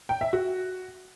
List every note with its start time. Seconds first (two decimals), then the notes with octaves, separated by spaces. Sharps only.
0.09 G5
0.21 E5
0.33 F#4